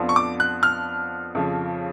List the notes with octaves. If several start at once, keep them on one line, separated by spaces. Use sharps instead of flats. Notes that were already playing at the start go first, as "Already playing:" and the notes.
Already playing: F2 F3 B3 D4 F4
C#6
D6
F#6
F6
F2 C#3 F3